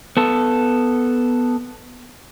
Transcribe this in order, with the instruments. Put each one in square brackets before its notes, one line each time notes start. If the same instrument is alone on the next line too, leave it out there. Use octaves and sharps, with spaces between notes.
[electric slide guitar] B3 A4